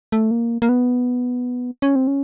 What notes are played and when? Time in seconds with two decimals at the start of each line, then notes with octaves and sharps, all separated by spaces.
0.12 A3
0.31 A#3
0.62 A#3
0.69 B3
1.82 C#4
1.96 C4
2.07 C#4